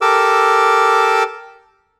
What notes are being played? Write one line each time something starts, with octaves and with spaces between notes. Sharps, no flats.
G4 A4 A#4 D6 E6